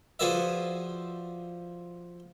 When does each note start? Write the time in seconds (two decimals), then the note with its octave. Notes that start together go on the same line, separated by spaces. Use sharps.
0.19 F3 F#4 G#4 B4 D5 E5